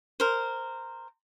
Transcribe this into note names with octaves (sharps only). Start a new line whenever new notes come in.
A#4 C5